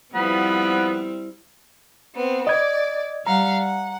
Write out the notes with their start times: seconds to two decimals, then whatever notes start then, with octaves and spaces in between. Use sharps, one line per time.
0.14 F3 G3 B3 C4 E4 B5
2.15 B3 C4
2.47 D5 D#5 D6 G#6
3.27 G3 F5 F#5 A#5
3.60 F#5